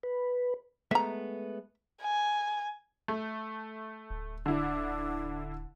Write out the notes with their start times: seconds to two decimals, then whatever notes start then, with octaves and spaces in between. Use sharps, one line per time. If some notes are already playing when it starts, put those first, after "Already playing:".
0.03 B4
0.91 G#3 A3 B3 E5 A#5
2.02 G#5
3.08 A3
4.10 D1
4.46 D3 D4 E4